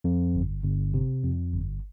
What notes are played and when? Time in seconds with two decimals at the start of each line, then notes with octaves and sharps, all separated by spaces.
0.04 F2
0.35 G1
0.64 G1
0.94 C3
1.24 F2
1.53 G1